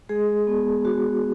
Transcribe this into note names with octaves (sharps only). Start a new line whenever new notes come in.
G#3 G#4
B3
F#4